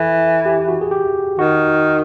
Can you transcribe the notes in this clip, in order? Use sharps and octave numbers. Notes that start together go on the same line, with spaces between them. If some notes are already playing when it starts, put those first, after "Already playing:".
Already playing: E3 A4
G4
F#4
G#4
G4
D#3 F#4